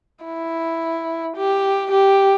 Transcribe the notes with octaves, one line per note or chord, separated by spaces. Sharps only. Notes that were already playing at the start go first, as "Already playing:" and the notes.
E4
G4
G4